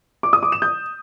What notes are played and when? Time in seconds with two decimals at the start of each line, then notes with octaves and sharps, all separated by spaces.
0.23 D6
0.33 D#6
0.43 D6
0.52 E7
0.62 G6